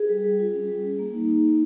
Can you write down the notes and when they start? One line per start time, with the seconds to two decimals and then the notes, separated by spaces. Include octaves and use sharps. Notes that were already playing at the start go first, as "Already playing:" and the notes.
Already playing: G#4
0.09 G3
0.24 G3
0.39 F4
0.53 C#4
0.68 G3
0.84 G3
0.99 A#3
1.14 D#4
1.28 D#4
1.43 A#3